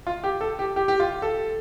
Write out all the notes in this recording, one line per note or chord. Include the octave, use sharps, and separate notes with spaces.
F4
G4
A4
G4
G4
G4
F4
A4